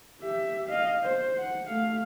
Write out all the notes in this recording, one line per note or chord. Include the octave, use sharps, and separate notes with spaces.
G4 E5
D#5 F5
C5
F#5
A3 F5